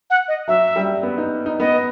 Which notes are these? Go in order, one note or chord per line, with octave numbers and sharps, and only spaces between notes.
F#5
D#5
F#3 E5
G3
B3
D#4
D#4
B3 D#5